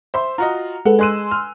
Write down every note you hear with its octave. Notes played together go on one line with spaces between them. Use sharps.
C5 E5 C6
F4 F#4 D#5 A#5
G#3 A4 B4 F#5
G#3 G#5 C6 E6 F#6 D#7
F6